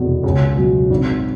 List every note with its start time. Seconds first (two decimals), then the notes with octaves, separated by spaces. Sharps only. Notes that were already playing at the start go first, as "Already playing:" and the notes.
Already playing: F1 E2 B2
0.24 C#2
0.56 B2 F#3
0.90 G#1